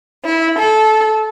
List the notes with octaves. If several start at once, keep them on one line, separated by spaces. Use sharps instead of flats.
E4
A4